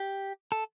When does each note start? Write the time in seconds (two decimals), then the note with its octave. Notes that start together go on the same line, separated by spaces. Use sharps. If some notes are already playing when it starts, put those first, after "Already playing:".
Already playing: G4
0.52 A4